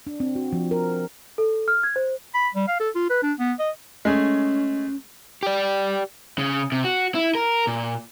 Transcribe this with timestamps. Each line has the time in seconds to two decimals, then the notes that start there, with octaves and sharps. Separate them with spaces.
0.07 D4
0.20 C4
0.35 F#4
0.52 F3
0.71 A#4
1.38 A4
1.68 F6
1.83 G#6
1.96 C5
2.34 B5
2.55 G3
2.68 F5
2.80 A4
2.95 F4
3.10 B4
3.23 D4
3.39 B3
3.59 D#5
4.05 G#3 A3 C#4 G#4
5.43 G4 D5
6.38 C#3
6.72 C3
6.84 F#4
7.15 E4
7.35 A#4
7.67 A#2